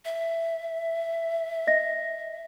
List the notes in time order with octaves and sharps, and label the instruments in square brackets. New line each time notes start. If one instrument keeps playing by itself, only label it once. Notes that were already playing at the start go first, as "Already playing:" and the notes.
[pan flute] E5
[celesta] D#5 A#6